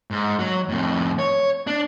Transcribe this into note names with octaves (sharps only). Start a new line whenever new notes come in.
G#2
F#3
F2 A2
C#5
D4